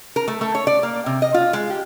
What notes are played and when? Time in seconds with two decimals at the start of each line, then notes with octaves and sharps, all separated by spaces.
0.16 A#4
0.28 A3
0.41 A3
0.55 C#5
0.67 D5
0.83 A#3
1.06 C3
1.22 D#5
1.34 F4
1.53 G#3
1.70 G4